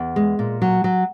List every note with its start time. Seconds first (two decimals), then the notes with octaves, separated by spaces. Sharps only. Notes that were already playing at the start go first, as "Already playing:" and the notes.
Already playing: E2
0.16 G#3
0.39 A#2
0.62 F#3
0.84 F#3